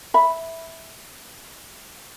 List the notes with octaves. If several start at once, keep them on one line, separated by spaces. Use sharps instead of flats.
E5 B5